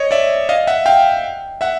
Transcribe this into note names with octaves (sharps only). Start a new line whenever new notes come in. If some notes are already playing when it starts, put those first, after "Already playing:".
Already playing: C#5 D#5
D5 E5
D#5 F5
E5 F#5
F5 G5
E5 F#5